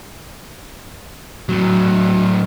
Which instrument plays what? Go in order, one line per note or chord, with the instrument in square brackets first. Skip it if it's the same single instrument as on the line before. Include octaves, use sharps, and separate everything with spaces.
[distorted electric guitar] A2 F#3